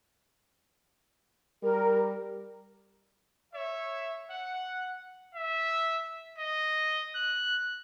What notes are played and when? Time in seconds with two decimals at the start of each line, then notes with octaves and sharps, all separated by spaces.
1.63 G3 A#4
3.53 C#5 E5
4.30 F#5
5.35 E5
6.38 D#5
7.15 F#6